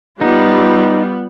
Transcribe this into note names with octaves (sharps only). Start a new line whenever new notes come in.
G3 B3 D#4 F4